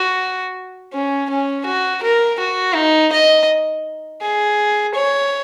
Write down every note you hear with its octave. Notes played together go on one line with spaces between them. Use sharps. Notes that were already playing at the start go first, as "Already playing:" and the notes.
Already playing: F#4
C#4
C#4
F#4
A#4
F#4
D#4
D#5
G#4
C#5